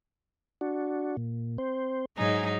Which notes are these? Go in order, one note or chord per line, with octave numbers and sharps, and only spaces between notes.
D4 F#4
A#2
C4 C5
G#2 F#3 D#4 G#5 A#5